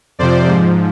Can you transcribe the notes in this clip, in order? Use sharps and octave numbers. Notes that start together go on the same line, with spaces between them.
F2 C3 F3 C5 D5
G#2 F3